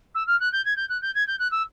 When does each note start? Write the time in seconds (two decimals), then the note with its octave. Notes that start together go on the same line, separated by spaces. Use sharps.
0.15 E6
0.27 F6
0.40 F#6
0.53 G6
0.65 G#6
0.77 G6
0.89 F#6
1.02 G6
1.15 G#6
1.28 G6
1.39 F#6
1.52 E6